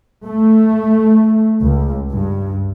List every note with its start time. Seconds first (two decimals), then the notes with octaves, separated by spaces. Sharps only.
0.25 A3
1.63 C#2
2.10 G2